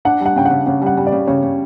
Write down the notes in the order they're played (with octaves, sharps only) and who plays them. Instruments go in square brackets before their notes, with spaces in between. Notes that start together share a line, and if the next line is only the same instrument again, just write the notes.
[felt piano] D4 [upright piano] F#5
[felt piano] G3
[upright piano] F#5
[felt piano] C#3 [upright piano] G5
[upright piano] F#5
[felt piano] C#3
[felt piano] C#3 [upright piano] F#5
[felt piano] G3 [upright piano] F#5
[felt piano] G3
[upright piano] D5
[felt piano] C#3
[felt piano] C#3 [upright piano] C#5
[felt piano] C#3